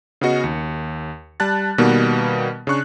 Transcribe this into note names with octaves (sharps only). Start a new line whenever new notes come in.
C#3 B3 C#4 F#4 D#5 C#7
D#2
G3 A5 F#6 A6
B2 D#3 G3 A#3 B3
C#3 D4 C#6 F#6